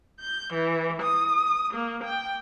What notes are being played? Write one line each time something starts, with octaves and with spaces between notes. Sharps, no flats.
G6
E3
D#6
A#3
G5